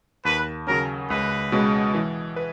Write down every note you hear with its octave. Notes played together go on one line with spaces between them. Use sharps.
D#2 B4
C#3 F#3 C#4 A#4
C#2 B4
B2 G#3 C#4
E3
B4